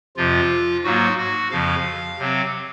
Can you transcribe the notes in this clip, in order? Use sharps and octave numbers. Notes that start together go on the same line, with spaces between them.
F2 C3 F3 F4
G#2 F#3 A#3 F#4
F#4
F2 C#3 F3 F5
C3 F#3 C4